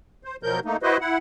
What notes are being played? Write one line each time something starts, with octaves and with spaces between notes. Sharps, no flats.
C5
B2 F3 F#3 A#4 G6
A3 A#3 D#4
E4 F#4 B4 C5 D#5
E4 F#5